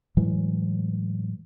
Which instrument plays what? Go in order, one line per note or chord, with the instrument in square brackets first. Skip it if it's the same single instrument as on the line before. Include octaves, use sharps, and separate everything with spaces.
[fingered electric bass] A2 E3 F#3 G#3